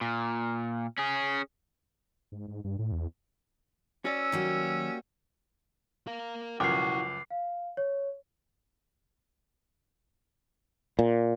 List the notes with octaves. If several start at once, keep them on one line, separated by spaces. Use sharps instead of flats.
A#2
C#4 G#4
G#2
G#2
G2
A2
E2
C#4 F#4 D5 E6
D#3 F#3 G3 A#3 F#4
A#4 F5
C#2 F#2 F3 E4 F#4 G5 D6 C7
F5
C#5
A#2